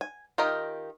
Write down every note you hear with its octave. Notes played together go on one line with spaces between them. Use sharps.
G#5
D#3 F4 G4 A#4 D#5